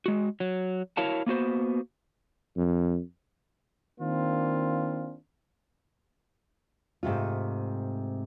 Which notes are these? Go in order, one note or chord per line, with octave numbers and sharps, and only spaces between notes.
G#3 F#4
F#3
E4 F#4 A#4 C#5 F5 A5
A#3 B3 F#4 C5
F2
D#3 A#3 C4 D4 F4
G#2 C3 A3 F4